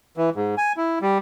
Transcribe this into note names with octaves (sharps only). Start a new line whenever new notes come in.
E3
G#2
G#5
E4
G3